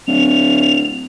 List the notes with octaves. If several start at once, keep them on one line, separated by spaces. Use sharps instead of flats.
D1 F7